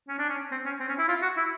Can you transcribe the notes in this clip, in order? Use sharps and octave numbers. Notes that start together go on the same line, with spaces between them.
C#4
D4
C#4
C4
C#4
C4
C#4
E4
F4
F#4
E4